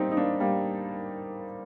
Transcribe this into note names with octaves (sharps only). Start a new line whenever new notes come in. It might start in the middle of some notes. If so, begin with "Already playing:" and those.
Already playing: G3 A#3 C4 D#4
D#4
A#3 D4
G3 A#3